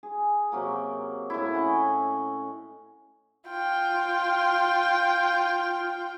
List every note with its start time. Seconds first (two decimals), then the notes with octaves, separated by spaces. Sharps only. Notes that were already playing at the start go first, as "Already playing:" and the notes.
0.03 G#4
0.52 C3 F#3 A#3
1.30 A2 E4
1.53 C#4 D#5 F#5
3.49 F4 G5